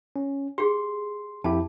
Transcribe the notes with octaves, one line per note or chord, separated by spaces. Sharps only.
C#4
G4 G#4 C6
F2 E4 G4 A5